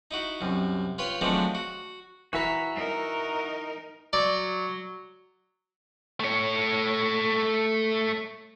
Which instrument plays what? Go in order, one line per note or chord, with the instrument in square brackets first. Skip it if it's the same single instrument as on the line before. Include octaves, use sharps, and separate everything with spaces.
[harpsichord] D#4 E4 F#4
C2 F#2
F4 B4 C#5 G5 C6
F3 F#3 G#3 A3 C4 D4
F#4
[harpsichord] E3 B4 [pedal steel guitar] F#4 E5 A#5
[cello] D#4 A#4
[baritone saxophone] F#3 [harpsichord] D5
[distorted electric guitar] A3 C#5